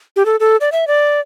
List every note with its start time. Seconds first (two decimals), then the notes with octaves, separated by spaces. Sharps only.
0.16 G4
0.26 A4
0.40 A4
0.61 D5
0.72 E5
0.87 D5